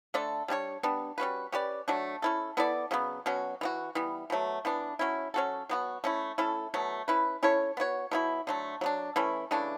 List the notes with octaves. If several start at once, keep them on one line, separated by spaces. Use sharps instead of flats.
D3 A3 D4 A4
G3 D4 G4 C#5
G3 B3 D4
G3 C#4 F#4 B4
C#4 G4 B4 D5
F#3 A3 D4
C#4 E4 A4
B3 E4 A4 D5
C#3 F#3 B3
B2 F#3 C#4 F#4
E3 B3 F#4
E3 G3 B3
B2 F#3 A3
E3 B3 D4
F#3 C#4 E4
F#3 C#4 F#4 A4
F#3 B3 F#4
A3 C#4 E4
A3 C#4 E4 A4
B2 F#3 A3
C#4 E4 B4
C#4 E4 A4 C#5
B3 F#4 C#5
B2 F#3 A3 E4
D3 F#3 A3
F#3 B3 D4
E3 A3 C#4 E4
C#3 E3 A3 D4